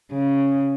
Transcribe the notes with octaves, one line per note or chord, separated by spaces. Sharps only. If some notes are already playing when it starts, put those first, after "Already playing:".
C#3